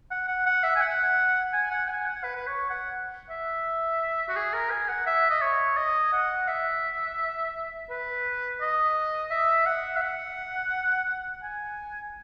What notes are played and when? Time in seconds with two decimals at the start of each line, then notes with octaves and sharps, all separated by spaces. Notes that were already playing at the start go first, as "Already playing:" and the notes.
0.11 F#5
0.28 F#5
0.46 F#5
0.63 E5
0.76 G#5
0.81 F#5
1.53 G#5
1.71 F#5
1.88 G#5
2.06 F#5
2.24 B4
2.35 B4
2.47 C#5
2.70 F#5
3.30 E5
4.29 F#4
4.36 G#4
4.53 A#4
4.70 G#5
4.88 F#5
5.06 E5
5.30 D#5
5.41 C#5
5.77 D#5
6.13 F#5
6.48 E5
7.90 B4
8.61 D#5
9.31 E5
9.66 F#5
9.96 E5
10.01 F#5
11.43 G#5